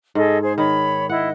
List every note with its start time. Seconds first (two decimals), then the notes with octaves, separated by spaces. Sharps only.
0.15 G#2 G#4 A4 D#5
0.41 G#4 C5
0.58 D#3 C#5 B5
1.09 E4 D#5 F#5